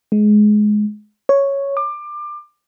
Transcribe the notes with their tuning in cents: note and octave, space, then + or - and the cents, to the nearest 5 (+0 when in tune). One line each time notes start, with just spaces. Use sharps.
G#3 +20
C#5 +0
D6 +25